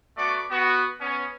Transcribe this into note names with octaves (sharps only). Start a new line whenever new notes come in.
A3 B3 F#4 D5
B3 F#4
B3 C#4